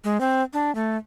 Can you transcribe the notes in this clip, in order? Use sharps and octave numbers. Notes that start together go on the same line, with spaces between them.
G#3
C4
D4
A3